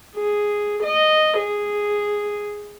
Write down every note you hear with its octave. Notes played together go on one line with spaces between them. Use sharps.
G#4
D#5
G#4